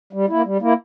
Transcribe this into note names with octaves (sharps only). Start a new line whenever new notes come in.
G3
A#3 E4
G3
A#3 E4